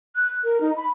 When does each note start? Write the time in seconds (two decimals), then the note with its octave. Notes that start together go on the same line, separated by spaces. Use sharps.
0.16 F#6
0.44 A#4
0.61 D#4
0.76 B5